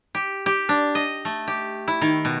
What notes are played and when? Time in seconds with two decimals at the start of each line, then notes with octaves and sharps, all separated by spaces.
0.15 G4
0.46 G4
0.69 D4
0.95 D#5
1.25 A3
1.48 G4
1.88 E4
2.01 D#3
2.25 B2